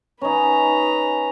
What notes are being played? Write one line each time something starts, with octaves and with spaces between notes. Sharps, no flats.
C#4 D#4 B4 A#5